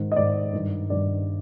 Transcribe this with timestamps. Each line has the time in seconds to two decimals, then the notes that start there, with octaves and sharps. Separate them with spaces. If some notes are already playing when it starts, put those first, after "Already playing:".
Already playing: G#2 D#3
0.12 D#5
0.16 G#2 D#3 D5
0.53 G2 D#3
0.90 G2 D#3 D5